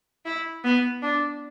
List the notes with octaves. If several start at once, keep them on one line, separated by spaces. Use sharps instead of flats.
E4
B3
D4